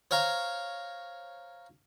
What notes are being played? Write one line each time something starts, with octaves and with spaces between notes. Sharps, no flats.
C5 C#5 F5 A#5